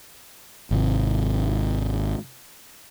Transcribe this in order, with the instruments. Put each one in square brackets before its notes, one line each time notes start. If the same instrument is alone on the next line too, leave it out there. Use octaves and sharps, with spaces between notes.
[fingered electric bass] G#1 C3 C4